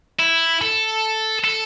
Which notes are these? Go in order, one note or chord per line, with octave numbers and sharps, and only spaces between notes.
E4
A4
A4